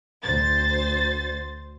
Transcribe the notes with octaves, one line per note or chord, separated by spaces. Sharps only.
D2 C5 A6